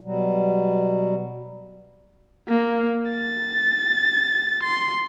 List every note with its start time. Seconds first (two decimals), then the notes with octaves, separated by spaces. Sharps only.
0.01 B2 F#3 G3
2.48 A#3
3.11 A6
4.63 C6